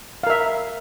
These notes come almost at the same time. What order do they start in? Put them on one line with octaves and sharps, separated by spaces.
F5 A#4 E5